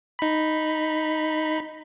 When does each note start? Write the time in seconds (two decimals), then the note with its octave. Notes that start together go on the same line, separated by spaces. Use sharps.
0.19 D#4 B5